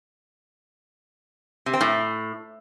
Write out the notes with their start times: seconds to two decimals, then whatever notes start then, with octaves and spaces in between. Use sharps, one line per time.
1.66 C3
1.73 C4
1.81 A2